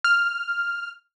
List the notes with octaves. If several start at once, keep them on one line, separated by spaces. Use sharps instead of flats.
F6